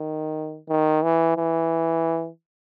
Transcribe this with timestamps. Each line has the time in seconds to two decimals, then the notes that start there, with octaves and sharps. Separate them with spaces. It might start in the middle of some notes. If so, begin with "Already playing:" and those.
Already playing: D#3
0.69 D#3
1.03 E3
1.37 E3